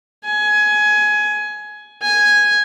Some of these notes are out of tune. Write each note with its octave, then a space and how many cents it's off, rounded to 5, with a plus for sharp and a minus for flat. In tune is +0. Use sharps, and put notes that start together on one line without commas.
G#5 +20
G#5 -5